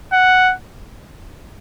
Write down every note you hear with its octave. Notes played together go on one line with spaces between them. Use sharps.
F#5